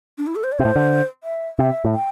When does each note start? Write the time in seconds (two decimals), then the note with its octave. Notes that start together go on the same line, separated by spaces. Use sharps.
0.18 D4
0.27 E4
0.35 A4
0.44 C5
0.52 D5
0.59 C3 C5
0.65 A2
0.76 D3
1.23 E5
1.58 C3 E5
1.85 A2
1.93 G5